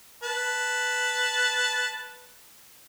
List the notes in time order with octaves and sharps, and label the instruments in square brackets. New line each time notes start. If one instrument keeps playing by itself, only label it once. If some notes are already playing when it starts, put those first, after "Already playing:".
[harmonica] B4 A5